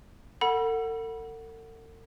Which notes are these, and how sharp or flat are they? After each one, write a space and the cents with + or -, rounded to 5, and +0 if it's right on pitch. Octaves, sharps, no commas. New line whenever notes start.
A4 +45 F#5 +0 B5 -25